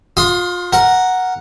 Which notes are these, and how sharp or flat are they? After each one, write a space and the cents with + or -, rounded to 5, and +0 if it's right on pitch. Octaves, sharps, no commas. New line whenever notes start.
F4 +30 C6 +0 D#6 +0
A#4 +0 F#5 +0